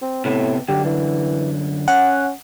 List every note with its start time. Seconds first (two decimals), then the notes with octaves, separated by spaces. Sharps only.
0.02 C4
0.25 A2 C3 B3
0.69 F#2 D3 G4
0.85 E3
1.88 C#4 F#5